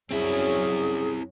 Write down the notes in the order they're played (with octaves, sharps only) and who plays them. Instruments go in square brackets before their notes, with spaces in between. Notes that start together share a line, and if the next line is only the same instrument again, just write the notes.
[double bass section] F#2 F#3 C#4 [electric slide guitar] C4 E4 [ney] G#4